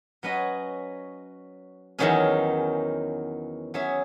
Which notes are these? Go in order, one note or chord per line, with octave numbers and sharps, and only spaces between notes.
F#3 C#4 F#4 B4 D#5
E2 D#3 F#3 C#4 G#4
F#3 C#4 G#4 C#5 E5